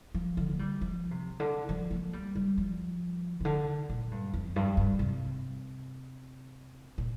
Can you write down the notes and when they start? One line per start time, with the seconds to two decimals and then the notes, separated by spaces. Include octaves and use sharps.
0.14 F3
0.37 D3
0.50 A#3
0.59 G3
0.81 F3
1.11 C3
1.40 D3
1.69 F3
1.91 A#3
2.13 G3
2.35 G3
2.58 F3
3.41 C3
3.45 D3
3.90 A#2
4.11 G2
4.34 F2
4.56 G2
4.77 G2
4.99 C3
6.98 A#2